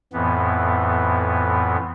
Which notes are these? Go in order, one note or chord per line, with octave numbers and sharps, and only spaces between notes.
F2 A2 E3 B3